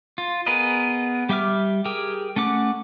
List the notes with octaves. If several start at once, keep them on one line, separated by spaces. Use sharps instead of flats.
F4
B3 G#4 A#4 B4 D#5
G3 G4 E5 D6 F6
G4 G#4 A#4 G5
A3 C#4 F#5 D6